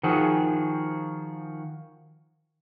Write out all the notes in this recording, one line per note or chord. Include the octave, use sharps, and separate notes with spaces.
D#3 F3 F#4 G#4